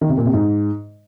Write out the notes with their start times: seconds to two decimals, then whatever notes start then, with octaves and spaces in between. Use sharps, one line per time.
0.01 D#3
0.09 C3
0.17 A#2
0.25 C3
0.33 G#2